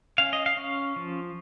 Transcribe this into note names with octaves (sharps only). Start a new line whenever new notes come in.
C#4 F5
D#5
F5
C#4
F3